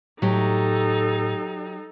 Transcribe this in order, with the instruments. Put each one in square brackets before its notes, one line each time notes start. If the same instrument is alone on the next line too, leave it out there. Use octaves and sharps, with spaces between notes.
[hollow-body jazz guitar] A2 [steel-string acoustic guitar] F#3 G4 [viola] D#4 A4